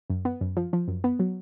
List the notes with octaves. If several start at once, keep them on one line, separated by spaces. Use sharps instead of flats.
F#2
B3
F#2
F3
F3
F#2
B3
F#3